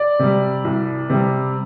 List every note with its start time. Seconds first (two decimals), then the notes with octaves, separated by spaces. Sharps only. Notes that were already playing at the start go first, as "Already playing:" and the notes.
Already playing: D5
0.19 C3 G3
0.64 C2
1.10 C3 G3